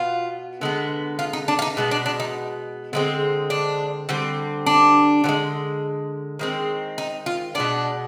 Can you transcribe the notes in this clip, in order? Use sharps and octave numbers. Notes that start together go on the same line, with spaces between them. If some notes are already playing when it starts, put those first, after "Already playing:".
Already playing: B2 B3 F4
D3 G#3 B3
F4
D#4
D4
F4
D#4
B2 G#3 B3
D4
D4
D#4
D3 G#3 C4
D4
D3 G3 C4
D4
D3 F3 G#3
D#3 G#3 C4
D#4
F4
B2 G#3 B3 D4